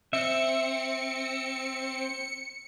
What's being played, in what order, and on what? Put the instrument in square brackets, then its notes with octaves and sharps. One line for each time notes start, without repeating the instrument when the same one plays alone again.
[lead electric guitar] C4 [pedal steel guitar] E5 [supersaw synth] C#7